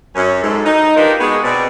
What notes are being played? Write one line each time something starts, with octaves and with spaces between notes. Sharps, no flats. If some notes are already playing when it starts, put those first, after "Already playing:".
F#2 C#4
G#2 A4
D#4
D4 D#4 F4 G4 A#4 B4
G#3 B3 F#4 G#4
B2 C4 D5